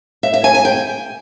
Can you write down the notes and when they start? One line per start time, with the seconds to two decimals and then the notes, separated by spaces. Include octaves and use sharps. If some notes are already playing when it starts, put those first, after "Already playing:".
0.23 E5
0.34 E5
0.44 G#5
0.54 G#5
0.65 G5